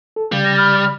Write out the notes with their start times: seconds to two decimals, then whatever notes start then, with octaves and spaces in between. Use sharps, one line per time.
0.16 A4
0.32 C#3 G3 F5
0.44 A#6
0.57 B5 F6